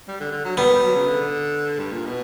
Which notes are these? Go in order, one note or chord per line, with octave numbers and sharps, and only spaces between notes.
G3
D3
D3
F#3
G3 B3
A#3
G3
F#3
C#3
D3
G2
A#2
B2